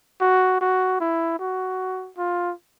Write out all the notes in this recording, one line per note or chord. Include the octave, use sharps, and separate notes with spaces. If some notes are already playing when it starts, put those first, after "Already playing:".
F#4
F#4
E4
F#4
F4